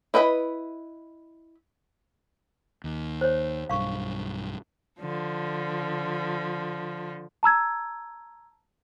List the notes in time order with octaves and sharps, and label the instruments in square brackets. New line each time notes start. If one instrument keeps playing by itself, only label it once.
[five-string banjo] E4 B4 D#5 G#5 B5
[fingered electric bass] D#2
[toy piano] C5 C#5
[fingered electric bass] B1 G2 [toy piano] F5 C#6
[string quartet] D3 F3
[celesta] A5 A#5 E6 G#6